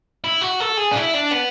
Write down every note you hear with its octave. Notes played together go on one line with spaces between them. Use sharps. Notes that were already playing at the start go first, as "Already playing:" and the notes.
E4
F#4
A4
G#4
D4
E4
D4
B3